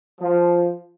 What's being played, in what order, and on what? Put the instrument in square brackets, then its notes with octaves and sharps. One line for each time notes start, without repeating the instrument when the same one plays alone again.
[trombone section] F3